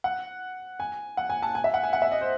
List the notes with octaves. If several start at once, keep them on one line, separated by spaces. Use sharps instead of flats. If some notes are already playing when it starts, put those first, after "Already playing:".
F#5
G#5
F#5
G#5
A5
G#5
E5
F#5
G#5
F#5
E5
D#5
C5